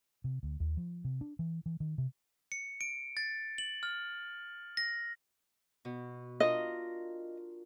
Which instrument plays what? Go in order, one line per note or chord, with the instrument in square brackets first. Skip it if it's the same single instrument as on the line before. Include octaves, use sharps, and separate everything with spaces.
[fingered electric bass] C3
D2
D#2
F3
C3
D4
E3
E3
D#3
C3
[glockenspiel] C#7
D7
A6
F#7
F6
A#6
[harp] B2
[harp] D4 F4 A#4 [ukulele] D#5